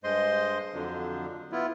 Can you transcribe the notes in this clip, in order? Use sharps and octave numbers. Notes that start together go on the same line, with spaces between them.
G2 G#3 C5 D#5 C6
F2 D3 F3 F#3 D4
B3 E4 F4